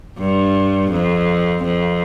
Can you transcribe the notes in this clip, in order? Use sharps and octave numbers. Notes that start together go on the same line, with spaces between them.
G2
F2
F2